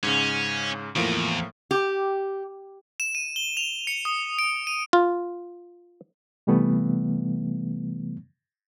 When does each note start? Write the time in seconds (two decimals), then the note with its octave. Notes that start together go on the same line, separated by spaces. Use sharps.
0.03 G#2 C#3 C#4
0.96 E2 A2 F3 A#3
1.71 G4
3.00 E7
3.15 D#7
3.36 G7
3.57 F7
3.87 C#7
4.05 D#6
4.39 D7
4.67 D#7
4.93 F4
6.47 C3 E3 G3 A3 B3